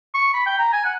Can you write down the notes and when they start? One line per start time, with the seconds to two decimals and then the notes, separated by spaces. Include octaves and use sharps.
0.14 C#6
0.34 B5
0.46 G5
0.59 A#5
0.73 G#5
0.85 F#5